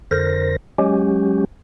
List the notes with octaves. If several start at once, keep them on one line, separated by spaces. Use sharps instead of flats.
F2 D3 A#4 C5 A#6
F#3 G#3 C#4 G4